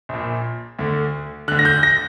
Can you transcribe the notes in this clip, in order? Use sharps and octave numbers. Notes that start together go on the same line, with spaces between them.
A#1 A#2
D2 D3
D2 D3 F#6
A#6
G6
A#6